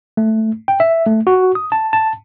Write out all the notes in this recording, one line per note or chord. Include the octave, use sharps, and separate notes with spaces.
A3
G5
E5
A3
F#4
D#6
A5
A5